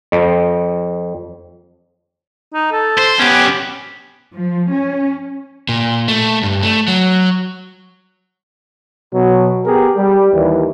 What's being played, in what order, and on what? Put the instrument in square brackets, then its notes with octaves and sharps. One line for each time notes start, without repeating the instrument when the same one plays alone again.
[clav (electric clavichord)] F2
[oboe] D#4
A4
[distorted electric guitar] C5
[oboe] B3 [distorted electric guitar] C#4 G4
[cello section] F3
C#4
[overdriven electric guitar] A#2
A3
G2
A3
F#3
[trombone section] B2 F#3
B3 G4 G#4 A#4
G3
D#2 E3